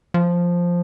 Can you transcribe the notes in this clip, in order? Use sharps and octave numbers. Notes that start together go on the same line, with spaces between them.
F3